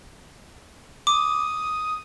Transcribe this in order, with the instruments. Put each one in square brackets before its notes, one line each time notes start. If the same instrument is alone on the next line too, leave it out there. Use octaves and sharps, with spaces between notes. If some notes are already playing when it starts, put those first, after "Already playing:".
[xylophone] D6 [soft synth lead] D#6